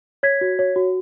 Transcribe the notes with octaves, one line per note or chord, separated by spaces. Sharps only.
C#5 G#6 B6
F#4
C#5
F#4